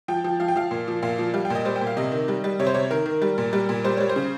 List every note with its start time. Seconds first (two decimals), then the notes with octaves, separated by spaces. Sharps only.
0.08 F3 G5
0.24 F3
0.40 F3 F5
0.48 G5
0.56 F3 F5
0.71 A#2
0.88 F3
1.03 A#2 F5
1.18 F3
1.34 G3 F5
1.45 G5
1.50 A#2 D#5
1.65 G3 C5
1.76 G5
1.81 A#2
1.87 F5
1.97 C3 D#5
2.12 D#3
2.28 G3
2.44 G3
2.60 C3 C#5
2.67 C5
2.74 C3 C#5
2.91 D#3 A#4
3.06 D#3
3.22 G3
3.38 A#2
3.53 G3
3.69 A#2
3.84 G3 C5
3.97 G3 C#5
4.09 C5
4.16 C#3